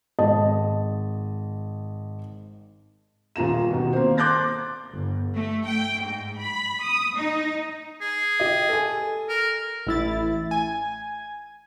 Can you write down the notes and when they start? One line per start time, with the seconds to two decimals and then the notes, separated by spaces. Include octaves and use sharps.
0.19 G#1 D#5 A5
3.36 D#1 F4 A#5 E7
3.70 B2 D#3
3.93 A#3 C4 C5
4.17 C6 D6 F#6 G6 A6 A#6
4.92 G1
5.35 A3
5.67 G5
6.02 G#2
6.40 B5
6.82 D#6
7.16 D#4
8.01 G#4
8.40 G4 D#5
8.69 A4 G#5
9.29 A#4
9.87 A1 E4 A6
10.51 G#5